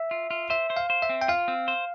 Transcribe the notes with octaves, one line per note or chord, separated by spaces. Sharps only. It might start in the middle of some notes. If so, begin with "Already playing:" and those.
Already playing: E5
F4
F4
C5 E5
C5
F5
C5
E5
C4
G5
F4 F5
C4
C5